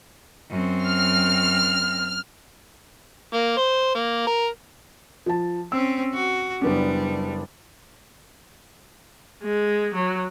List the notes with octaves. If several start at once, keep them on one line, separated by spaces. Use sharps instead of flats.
F#2 C4
F6
A#3
C5
A#3
A#4
F3 A5
C4 C#4 E6
F#4
F#1 G3 B3 D4
G#3
F#3